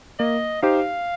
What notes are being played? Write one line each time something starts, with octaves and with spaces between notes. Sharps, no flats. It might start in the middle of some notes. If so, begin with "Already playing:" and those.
A#3 D#5
D#4 G4 C5 F5